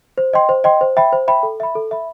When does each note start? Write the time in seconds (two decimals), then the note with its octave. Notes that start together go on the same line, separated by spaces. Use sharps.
0.18 C5
0.33 D#5 G5 C6
0.49 C5
0.64 D#5 G5 C6
0.81 C5
0.97 E5 G5 B5
1.13 C5
1.28 E5 G5 B5
1.43 A4
1.60 E5 B5
1.75 A4
1.91 E5 B5